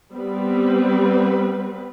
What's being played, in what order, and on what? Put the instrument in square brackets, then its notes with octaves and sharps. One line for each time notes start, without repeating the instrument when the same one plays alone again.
[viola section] G3 B3 C4 B4